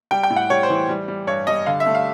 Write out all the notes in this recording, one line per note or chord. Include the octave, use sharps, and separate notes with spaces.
G3 G5
G5
A2
F#5
G3 C#5
C5
E3
G3
G3
G2 C#5
G3 D#5
D3 F5
E5
A3
F5